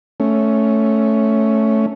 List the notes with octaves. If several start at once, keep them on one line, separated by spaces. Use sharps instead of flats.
A3 C#4